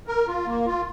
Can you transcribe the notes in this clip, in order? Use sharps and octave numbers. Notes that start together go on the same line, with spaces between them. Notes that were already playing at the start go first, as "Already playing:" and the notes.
A#4
F4
A#3
F4